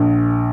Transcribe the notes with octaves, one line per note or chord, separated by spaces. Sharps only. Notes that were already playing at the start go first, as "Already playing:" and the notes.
Already playing: A#1